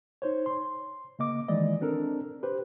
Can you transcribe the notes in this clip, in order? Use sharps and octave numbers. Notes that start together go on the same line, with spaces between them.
D#4 C5 C#5
C6
C#3 A#3 D#5 D6
D#3 E3 G#3 D5 D#5
C4 D4 A4 A#4
G4 B4 C5